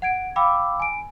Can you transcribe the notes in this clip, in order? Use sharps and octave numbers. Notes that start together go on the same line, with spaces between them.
F#5 G#6 D7
F5 G5 B5 D6 E6
G#5 D7